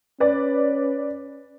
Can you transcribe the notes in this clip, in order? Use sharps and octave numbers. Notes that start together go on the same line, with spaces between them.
C#4 B4 D5